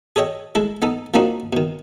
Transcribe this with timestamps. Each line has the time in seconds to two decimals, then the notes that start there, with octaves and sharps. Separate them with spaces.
0.16 G#4 A4 C#5 D#5 G5
0.55 G#3 E4 A4
0.82 B3 D#4 A4
1.14 F3 A#3 C4 D4 D#4 F#4
1.53 B2 D#3